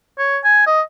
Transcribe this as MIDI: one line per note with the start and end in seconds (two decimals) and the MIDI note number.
0.18 0.38 73
0.44 0.65 80
0.66 0.81 75